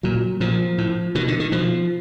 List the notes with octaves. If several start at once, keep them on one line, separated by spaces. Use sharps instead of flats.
A#2 F#3
A#2 F3
A2
B2 D#3
D3
D#3
B2 F3